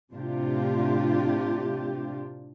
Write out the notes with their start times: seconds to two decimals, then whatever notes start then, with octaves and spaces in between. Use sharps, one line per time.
0.12 A2 C3 D4 F4 G4